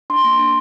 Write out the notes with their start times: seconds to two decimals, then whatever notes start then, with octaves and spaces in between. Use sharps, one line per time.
0.10 D4 C6
0.24 A#3
0.39 D4